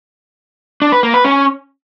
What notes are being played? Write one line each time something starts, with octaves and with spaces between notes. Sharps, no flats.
D4
B4
A#3
B4
C#4